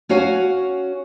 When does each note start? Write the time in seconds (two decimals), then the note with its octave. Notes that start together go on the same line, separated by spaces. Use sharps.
0.09 C#4 F#4 C#5 F5 F#5 G#5